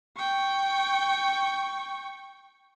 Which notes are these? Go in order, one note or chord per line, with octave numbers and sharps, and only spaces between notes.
G5 C#6